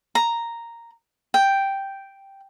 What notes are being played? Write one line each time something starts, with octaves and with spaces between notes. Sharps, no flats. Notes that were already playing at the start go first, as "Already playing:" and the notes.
A#5
G5